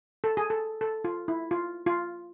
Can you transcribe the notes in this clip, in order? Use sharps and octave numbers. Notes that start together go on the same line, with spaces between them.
A4
G#4
A4
A4
F4
E4
F4
F4